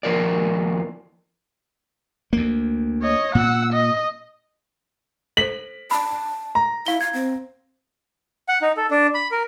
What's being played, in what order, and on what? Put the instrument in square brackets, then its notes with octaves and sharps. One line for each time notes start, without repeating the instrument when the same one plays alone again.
[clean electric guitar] D#2 F3 A#4 D5
[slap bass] D2 A#3
[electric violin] C#5 D#5
[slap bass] A#2 [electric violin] F#5 E6
[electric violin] D#5
[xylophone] A4 C5 [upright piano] B6 F#7
[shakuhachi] A5 [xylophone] B5
[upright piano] A#5
[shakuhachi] E4 [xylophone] F5 G7
[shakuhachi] F5 [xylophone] G#6
[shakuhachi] C4
[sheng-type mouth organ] F#5
D#4
A4
D4
B5
A#4